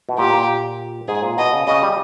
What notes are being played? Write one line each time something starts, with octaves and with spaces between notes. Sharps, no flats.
B2
A#2 G4
A#2
G#2 G#4
A#2
B2 D#5
C#3
C#3 D#5
G3